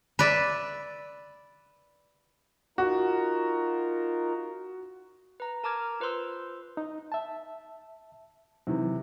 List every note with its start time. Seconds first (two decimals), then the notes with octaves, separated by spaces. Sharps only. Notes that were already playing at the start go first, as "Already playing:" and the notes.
0.19 B4 D5 E5
2.78 D#4 F4 F#4 A#4
5.40 B4 A#5
5.64 A#4 A5 A#5 D6 F6 G#6
6.00 F4 B4 C5 C6 E6
6.77 D#4
7.12 E5 A5
8.67 C3 D#3 E3 F#3